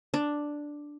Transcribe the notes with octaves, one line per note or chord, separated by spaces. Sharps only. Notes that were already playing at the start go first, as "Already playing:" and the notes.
D4